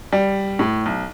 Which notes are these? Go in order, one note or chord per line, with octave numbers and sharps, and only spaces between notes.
G3
A2
B1